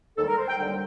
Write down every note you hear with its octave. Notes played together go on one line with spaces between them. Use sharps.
D#2 D#3 G3 A4
A#4
C5
G5
D#2 D3 G3